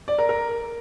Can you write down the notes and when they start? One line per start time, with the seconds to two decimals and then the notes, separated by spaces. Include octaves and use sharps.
0.08 D5
0.18 A#4
0.29 A#4